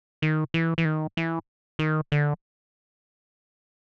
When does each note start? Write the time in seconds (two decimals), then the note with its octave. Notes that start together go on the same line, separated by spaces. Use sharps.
0.22 D#3
0.54 E3
0.78 E3
0.85 D#3
1.17 E3
1.79 D#3
2.12 D3